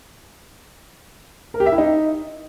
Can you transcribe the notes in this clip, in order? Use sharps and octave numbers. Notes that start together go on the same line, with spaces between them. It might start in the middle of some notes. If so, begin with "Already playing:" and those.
A#4
G4
E5
E4
D#4